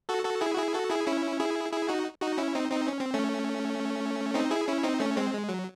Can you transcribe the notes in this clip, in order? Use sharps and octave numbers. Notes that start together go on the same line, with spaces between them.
F#4 A4
F#4 A4
E4 G#4
F#4
E4 G#4
F#4 A4
E4 G#4
C#4 E4
E4 G#4
E4 G#4
D#4 F#4
D#4 F#4
C#4 E4
C4 D#4
C4 D#4
C#4
C4
A3 C#4
C4 D#4
E4 G#4
C#4 E4
C4 D#4
A3 C#4
G#3 C4
G#3
F#3